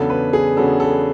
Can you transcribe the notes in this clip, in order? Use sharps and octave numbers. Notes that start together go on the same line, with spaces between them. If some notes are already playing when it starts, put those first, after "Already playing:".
Already playing: E2 C#3 F#3 B3 D4 A4
B4
G#4
E2 C#3 F#3 B3 D4 A4
A4